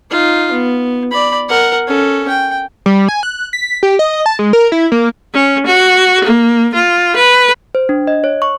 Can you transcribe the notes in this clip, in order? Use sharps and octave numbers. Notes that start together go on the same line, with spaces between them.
D#4 F4
B3
D5 B5
A#4 F#5
C#4 A4
G5
G3
G#5
F#6
B6
G4
D#5
A5
G#3
A#4
E4
A#3
C#4
F#4
A#3
F4
B4
C5
D4
D#5
C#5
C#6